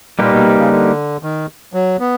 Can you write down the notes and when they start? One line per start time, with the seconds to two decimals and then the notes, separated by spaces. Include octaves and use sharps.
0.19 A#2 G3 A#3 D#4 G4 B4
0.33 B2
0.45 C3
0.58 C#3
0.70 D3
1.23 D#3
1.73 F#3
2.00 B3